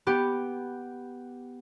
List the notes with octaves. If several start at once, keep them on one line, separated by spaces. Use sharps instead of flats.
B3 G4